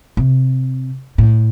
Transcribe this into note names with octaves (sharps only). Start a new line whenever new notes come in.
C3
A2